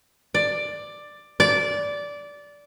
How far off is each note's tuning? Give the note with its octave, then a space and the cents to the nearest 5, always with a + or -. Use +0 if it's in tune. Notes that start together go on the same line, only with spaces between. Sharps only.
D5 +10
D5 -15